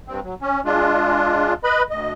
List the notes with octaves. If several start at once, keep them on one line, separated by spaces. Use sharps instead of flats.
G2 C4
F#3
C#4
G#3 D4 F4
B4 D#5 B5
D2 D#5